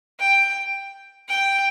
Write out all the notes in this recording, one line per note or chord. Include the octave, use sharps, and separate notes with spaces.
G5
G5